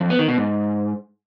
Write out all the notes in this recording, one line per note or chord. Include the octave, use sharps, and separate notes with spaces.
F2
B3
D#3
B2
G#2